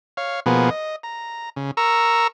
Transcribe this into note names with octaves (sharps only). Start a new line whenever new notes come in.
C#5 F5
B2 F3 A#3 B3 G#4
D#5
A#5
C#3
A#4 A#5 C#6 E6